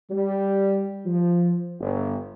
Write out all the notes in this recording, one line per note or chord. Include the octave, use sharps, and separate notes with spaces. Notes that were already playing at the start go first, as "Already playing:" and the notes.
G3
F3
G1